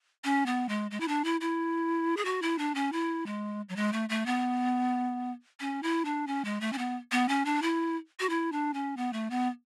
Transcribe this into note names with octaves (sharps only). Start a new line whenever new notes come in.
C#4
B3
G#3
G#3
E4
D4
E4
E4
G#4
F#4
E4
D4
C#4
E4
G#3
F#3
G#3
A3
A3
B3
C#4
E4
D4
C#4
G#3
A3
C#4
B3
B3
C#4
D4
E4
F#4
E4
D4
C#4
B3
A3
B3